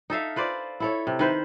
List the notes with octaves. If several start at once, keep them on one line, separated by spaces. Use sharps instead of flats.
D#4 A4 E5 F5
F4 B4 C5 D5
E4 A4 C#5
C3
D#3 B4 C5